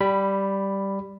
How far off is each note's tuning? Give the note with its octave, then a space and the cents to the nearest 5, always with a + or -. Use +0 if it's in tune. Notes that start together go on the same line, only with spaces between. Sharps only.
G3 -5 B5 +0